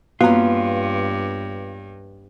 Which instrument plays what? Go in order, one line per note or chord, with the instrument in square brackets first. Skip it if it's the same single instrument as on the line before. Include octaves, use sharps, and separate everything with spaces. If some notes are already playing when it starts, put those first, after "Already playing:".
[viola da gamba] G2 [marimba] A#3 F#4 [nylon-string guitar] B3 C#4 [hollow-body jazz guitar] F4